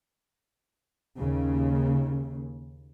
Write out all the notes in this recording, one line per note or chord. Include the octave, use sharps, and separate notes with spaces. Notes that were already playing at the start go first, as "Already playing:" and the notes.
D#2 C#3